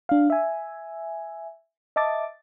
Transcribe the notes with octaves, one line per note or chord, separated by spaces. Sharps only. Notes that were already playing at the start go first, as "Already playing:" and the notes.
D4 F5
E5 G#5
D#5 E5 A5 D6 A6